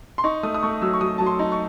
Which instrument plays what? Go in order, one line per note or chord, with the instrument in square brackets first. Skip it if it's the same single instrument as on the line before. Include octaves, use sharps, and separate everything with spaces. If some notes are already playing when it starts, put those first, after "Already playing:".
[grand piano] C6
D#4 C#6
A3 D#6
D#6
A3 C#6
F#3 E6
C#6
F#3 D#6
F#3 A5
C6
D#4
C#6